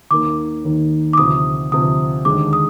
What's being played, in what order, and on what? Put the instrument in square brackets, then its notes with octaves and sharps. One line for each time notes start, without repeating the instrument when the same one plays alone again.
[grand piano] D#2 D#3 A#3 [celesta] D6
[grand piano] D#2 D#3 A#3
[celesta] D6
[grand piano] D2 C3 F3 [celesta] D#6
[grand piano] D2 C3 F3 [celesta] D#6
[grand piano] D#2 D3 G#3 [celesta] D6
[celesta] D#6